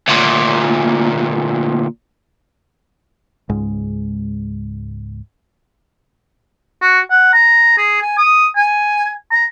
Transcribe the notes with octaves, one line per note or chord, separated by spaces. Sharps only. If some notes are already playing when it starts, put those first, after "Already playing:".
D2 A#2
C#2 G#2 G#3
F#4
F#5
A#5
G#4
G#5
D#6
G#5
A#5